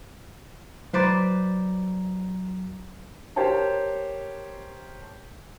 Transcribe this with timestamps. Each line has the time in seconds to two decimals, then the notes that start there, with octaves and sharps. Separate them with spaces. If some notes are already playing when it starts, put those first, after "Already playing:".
0.93 F#3 B4 C5 D5 A#5
3.36 G4 A#4 C5 C#5 A5